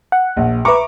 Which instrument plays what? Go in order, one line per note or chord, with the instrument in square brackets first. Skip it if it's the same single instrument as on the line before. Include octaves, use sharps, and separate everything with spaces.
[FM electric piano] F#5
[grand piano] A#1
[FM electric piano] B4 C#6 [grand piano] E5 A#5 D6